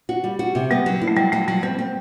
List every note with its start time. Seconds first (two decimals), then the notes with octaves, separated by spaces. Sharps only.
0.09 F#4
0.24 G3
0.39 F#4
0.55 C3
0.71 G3 B3
0.86 F#3
1.01 E4
1.08 A3
1.16 F#3 G3
1.32 F#3 A3
1.48 F#3 G3
1.63 G3 C4
1.79 C4